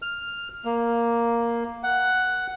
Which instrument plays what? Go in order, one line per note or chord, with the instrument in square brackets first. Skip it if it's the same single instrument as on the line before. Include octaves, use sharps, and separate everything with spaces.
[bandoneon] F6
A#3
F#5